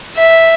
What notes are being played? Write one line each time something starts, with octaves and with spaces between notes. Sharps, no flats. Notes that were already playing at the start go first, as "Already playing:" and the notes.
E5